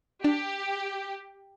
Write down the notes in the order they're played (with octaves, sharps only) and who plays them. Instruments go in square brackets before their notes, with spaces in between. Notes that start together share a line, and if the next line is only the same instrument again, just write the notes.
[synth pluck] D4 [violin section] G4